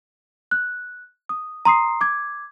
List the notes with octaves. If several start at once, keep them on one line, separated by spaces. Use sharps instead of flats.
F#6
D#6
A#5 C6 D#6 C7
D6 G#6